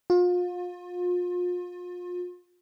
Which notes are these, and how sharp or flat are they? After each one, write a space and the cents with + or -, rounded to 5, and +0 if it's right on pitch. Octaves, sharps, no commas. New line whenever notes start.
F4 +35